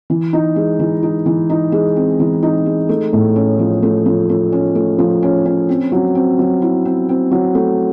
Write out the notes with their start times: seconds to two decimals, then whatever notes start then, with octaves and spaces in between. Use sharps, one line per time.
0.10 E3
0.33 D#4
0.56 G#3
0.79 E3
1.03 D#4
1.26 E3
1.50 D#4
1.72 G#3
1.96 C4
2.20 E3
2.43 D#4
2.66 G#3
2.89 A3
3.13 A2
3.36 C#4
3.59 F3
3.83 A3
4.06 F3
4.29 A3
4.52 C#4
4.75 A3
4.99 F3
5.23 C#4
5.46 C#4
5.69 C4
5.92 F#3
6.15 C4
6.39 F#3
6.62 E4
6.85 C4
7.09 C4
7.31 F#3
7.55 A3